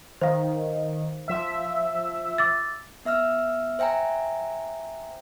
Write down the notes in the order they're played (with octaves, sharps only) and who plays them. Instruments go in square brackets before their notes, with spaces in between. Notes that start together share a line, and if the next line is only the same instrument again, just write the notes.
[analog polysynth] D#3 [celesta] C5 F5
[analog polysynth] F3 E5
[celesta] D6 E6 A6
[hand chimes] B3 E5 E6 F6
C5 E5 G5 G#5 A#5